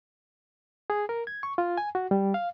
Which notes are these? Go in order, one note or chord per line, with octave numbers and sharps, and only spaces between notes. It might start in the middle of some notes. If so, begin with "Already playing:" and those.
G#4
A#4
G#6
C#6
F4
G#5
F#4
G3
F5